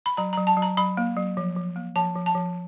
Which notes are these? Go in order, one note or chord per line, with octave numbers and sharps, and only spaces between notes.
B5
F#3 A#5
F#3 A#5
A5
F#3
A#5
F#3 B5
A#3
F#3
F3
F3
A#3
F3 A5
F3
A5
F3